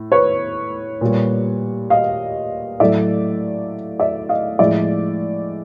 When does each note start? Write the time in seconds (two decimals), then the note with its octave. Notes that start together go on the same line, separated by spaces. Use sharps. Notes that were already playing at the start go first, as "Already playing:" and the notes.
Already playing: A2
0.12 B4 C#5
1.01 A#2 G3
1.90 D#5 F5
2.80 A2 F#3 A3 D5 E5
4.00 D5 E5
4.29 D#5 F5
4.59 A2 F3 G#3 D5 E5